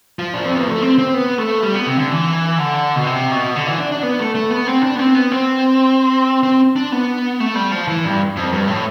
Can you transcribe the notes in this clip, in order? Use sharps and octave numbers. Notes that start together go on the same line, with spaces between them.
F3
D4
C4
B3
A3
C4
C4
B3
A3
G3
B3
C3
D3
E3
D3
B2
C3
B2
D3
E3
D4
D4
B3
A3
A3
B3
C4
D4
B3
C4
B3
C4
C4
D4
B3
A3
G3
F3
E3
G2
F2
G2
A2